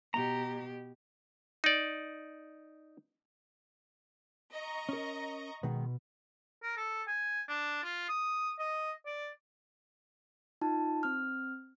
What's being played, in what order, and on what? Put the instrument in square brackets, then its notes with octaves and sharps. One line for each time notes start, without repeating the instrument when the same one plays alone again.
[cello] B2 G4 [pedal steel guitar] A#5
[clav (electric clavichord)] D#4 D5
[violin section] D#5 A#5 C#6
[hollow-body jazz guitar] C#4 A#4
[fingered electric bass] B2 [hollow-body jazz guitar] D#3 G#3 B3
[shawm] A#4
A4
G#5
D4
F4
D#6
D#5
D5
[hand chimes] D#4 F4 A5
C4 F6